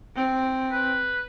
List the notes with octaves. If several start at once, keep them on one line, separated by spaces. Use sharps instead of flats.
C4
B4